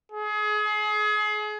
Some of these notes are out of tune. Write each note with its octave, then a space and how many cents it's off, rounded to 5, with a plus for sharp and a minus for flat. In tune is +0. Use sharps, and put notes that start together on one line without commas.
G#4 +30